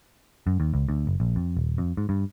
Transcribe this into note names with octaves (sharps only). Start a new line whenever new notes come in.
F#2
D#2
C#2
D2
F#1
A#1
F2
D#1
F2
G#2
G2